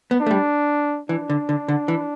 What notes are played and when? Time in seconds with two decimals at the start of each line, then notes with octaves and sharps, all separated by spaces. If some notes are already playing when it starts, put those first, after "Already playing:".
0.11 B3
0.21 D4
0.26 A3
0.31 G3
1.09 E3 D4
1.30 D3
1.49 D3
1.68 D3
1.88 E3